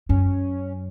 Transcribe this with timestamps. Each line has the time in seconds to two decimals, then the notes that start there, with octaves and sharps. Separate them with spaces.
0.09 F#2 C#4